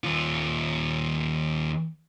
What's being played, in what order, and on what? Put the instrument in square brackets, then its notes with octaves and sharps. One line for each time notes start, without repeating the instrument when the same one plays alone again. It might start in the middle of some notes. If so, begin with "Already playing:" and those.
[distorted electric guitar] D#2 F4